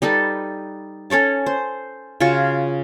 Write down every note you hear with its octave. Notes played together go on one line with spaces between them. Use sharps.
G3 D#4 A4 B4
C#4 A4 C#5 A5
C5
C#3 F4 F#4 C#6